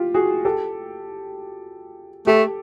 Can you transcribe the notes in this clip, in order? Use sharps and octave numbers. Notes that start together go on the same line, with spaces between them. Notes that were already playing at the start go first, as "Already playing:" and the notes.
Already playing: F4 G4
F#4 G#4
G4 A4
A3 G4 A4